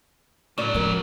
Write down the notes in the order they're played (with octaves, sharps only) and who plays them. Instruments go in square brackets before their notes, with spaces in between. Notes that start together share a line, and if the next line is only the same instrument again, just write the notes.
[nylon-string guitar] A2 D5 [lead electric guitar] C#3 F#3
[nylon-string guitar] D2 A#4 [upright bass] F3